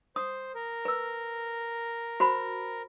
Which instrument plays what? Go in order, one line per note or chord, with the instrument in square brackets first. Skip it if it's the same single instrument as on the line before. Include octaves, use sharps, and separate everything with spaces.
[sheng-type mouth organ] C5 [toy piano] D#6
[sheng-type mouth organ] A#4
[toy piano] B4 E6
F#4 C5 B5